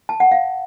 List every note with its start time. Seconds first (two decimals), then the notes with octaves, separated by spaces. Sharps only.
0.09 A5
0.20 F#5
0.31 F5